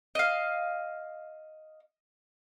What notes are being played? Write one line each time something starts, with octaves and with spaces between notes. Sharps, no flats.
D#5 F5